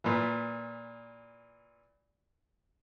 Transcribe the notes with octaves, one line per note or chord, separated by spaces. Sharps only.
A#2 E3